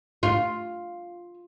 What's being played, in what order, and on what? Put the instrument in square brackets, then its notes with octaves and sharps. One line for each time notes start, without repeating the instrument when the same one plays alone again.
[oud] F4